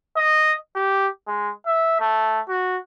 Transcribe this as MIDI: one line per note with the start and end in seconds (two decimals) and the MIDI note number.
0.17 0.55 75
0.75 1.08 67
1.28 1.51 56
1.67 1.96 76
2.00 2.40 57
2.49 2.78 66